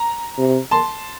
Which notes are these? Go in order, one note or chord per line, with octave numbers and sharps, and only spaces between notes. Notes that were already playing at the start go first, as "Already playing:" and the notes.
Already playing: A#5
C3
A5 C6